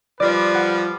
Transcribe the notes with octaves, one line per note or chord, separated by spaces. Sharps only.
F3 G3 B4 D5
F#5